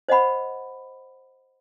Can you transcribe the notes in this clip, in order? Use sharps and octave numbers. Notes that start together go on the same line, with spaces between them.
C5 D#5 F#5 B5